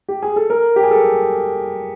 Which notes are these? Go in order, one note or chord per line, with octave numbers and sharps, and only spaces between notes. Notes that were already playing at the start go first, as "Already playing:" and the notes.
G4
G#4
A4
A#4
G4
G#4
A4